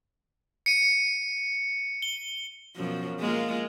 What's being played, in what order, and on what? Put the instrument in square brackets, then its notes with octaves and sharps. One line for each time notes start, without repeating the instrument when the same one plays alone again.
[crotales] C#7 D#7
G7
[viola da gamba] F#2 B2 F3
G#3 A#3 F4